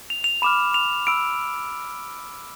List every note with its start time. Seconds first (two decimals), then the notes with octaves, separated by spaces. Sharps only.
0.10 F7
0.24 F7
0.42 B5 D6 F6 E7
0.74 F7
1.07 B5 E6 D7